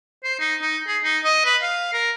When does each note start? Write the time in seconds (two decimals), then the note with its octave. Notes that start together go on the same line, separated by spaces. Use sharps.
0.24 C5
0.40 D#4
0.62 D#4
0.87 G#4
1.04 D#4
1.24 D#5
1.45 B4
1.62 F5
1.93 A#4